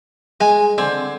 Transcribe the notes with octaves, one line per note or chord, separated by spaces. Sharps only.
G#3 G#5
D3 C4 G#5